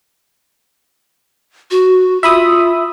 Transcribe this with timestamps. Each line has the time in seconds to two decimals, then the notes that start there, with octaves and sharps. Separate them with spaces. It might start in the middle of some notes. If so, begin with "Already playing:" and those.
1.71 F#4
2.23 F4 E5 B5 D#6